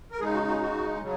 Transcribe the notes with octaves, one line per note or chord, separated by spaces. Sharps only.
A#4
C#3 G#3 D#4 G#4
F#4
F#4
F#4
C#3 F#3